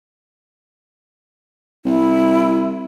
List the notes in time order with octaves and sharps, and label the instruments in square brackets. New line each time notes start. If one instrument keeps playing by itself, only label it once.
[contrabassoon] C2 [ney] E4